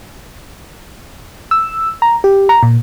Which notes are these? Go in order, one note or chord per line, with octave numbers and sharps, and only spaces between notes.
E6
A#5
G4
A#5
A#2